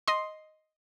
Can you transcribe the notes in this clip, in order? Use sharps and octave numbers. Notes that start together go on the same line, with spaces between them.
D#5 C6